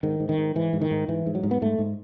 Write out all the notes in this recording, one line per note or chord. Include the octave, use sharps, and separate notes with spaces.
G#2 D#3
G#2
D#3
G#2
G#2 E3
G#2
D#3
G#2
G#2 E3
G#2
F#3
G#2
B3
G#2 A3
G#2